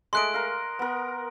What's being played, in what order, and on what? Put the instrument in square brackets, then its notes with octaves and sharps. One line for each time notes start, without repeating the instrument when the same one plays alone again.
[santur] G#3 A3 D#5 [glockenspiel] C6 F#6 D7
[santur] A#4 F5
B3 A#4